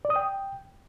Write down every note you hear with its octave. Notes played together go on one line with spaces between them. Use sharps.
D5
D#6
G5